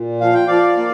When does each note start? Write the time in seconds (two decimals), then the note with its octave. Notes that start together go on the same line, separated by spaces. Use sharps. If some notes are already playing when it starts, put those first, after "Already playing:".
Already playing: A#2
0.21 F3 F5
0.34 G5
0.47 F3 D5 F5
0.77 A#3